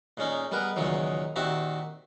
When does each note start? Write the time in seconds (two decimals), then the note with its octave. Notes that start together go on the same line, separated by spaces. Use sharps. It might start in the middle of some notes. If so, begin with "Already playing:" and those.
0.17 A#2 G#3 C#4 D#4
0.51 G3 G#3 B3 A#4 B4
0.76 C#2 A#2 D#3 E3 F#3 G#3
1.36 A#2 D#3 C4 F#4 G4 E5